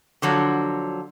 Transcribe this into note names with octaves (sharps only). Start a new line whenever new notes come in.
D3 F3 F#3